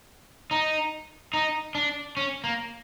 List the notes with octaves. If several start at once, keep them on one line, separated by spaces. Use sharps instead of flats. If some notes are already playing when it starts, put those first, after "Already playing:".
D#4
D#4
D4
C#4
A#3